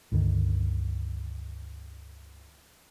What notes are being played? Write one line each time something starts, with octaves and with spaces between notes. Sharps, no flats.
C#2 G2 D3 D#3